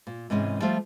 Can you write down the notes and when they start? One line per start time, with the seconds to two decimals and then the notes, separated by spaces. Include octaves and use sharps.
0.07 A#2
0.30 G#2 C3 E3 G#3 C#4
0.61 F3 G3 A3 F4 C5 F5